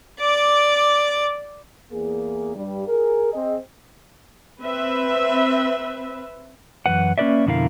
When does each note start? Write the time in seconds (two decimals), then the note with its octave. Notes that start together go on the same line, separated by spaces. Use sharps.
0.20 D5 D6
1.92 E2 A#3 G#4
2.56 G2 G3
2.88 G#4 A#4
3.33 C4 G#4 D#5
4.62 C4 B4 E5
6.86 F#2 E3 B4 F#5
7.18 A#3 C#4 G4 B4 D5 E5
7.46 F2 B2 D3 E4 A#4 F5